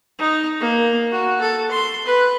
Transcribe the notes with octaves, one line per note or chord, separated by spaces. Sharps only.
D#4
A#3
F#4
A4
C6
B4